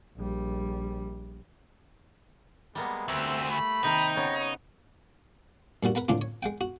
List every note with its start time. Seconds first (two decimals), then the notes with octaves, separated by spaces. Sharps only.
0.17 A#1 G3
2.75 G3 G#3 A#3 B3
3.08 D2 C4 E5
3.50 A3 B5
3.84 C3 D#3 A#3 D#4 G5
4.16 C#3 B3 C#5
5.83 G2 A#2 G3 F#4
5.95 A#4 B4 F#5 A#5
6.08 C#2 A2 D3 D4 F4
6.21 C#5
6.43 G#3 F#5 G5
6.61 F#4